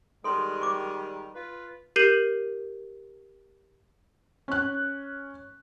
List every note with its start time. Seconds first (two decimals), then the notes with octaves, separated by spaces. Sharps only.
0.24 D#3 G3 G#3 A4 C6
0.62 C#6 D6
1.35 F4 B4
1.96 G4 A#4 G6 C7 D#7 F#7
4.48 C#4 F#6